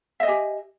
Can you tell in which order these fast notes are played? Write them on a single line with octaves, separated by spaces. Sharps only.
E5 D#5 G#5 G4